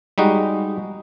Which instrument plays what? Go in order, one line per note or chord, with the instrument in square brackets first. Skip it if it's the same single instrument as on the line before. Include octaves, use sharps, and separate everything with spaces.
[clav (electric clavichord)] G3 G#3 D#4 F#4